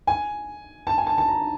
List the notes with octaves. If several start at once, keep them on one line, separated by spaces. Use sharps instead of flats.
G#5
A5
G#5
A5
A5
A#5